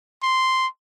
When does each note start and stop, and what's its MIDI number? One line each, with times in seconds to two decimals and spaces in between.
0.23 0.67 84